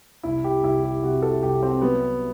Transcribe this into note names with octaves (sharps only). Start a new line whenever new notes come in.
C2 E4
G4
C2 E4
G4
C3 F#4
A4
C2 G4
C4
F#3 B3